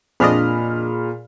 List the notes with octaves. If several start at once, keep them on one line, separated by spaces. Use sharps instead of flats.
F2 A#2 D4 G#4 D#5 B5 F6